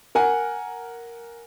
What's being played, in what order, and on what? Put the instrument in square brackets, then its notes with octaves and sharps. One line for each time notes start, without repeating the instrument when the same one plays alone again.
[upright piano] A#4 F#5 G#5